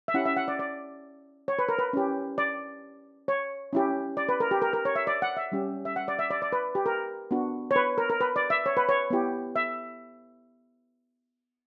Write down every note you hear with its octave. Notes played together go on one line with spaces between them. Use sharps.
E5
C#4 E4 G4 F#5
E5
F#5
D5
D5
C#5
B4
A#4
B4
C#4 E4 G4
D5
C#5
C#4 E4 G4
D5
B4
A#4
G4
A#4
A#4
C#5
E5
D5
F#5
E5
G3 C#4 G4
E5
F#5
D5
E5
D5
D5
B4
G4
A#4
B3 D4 F#4
C#5
B4
A#4
A#4
B4
D5
E5
C#5
B4
C#5
B3 E4 G4
E5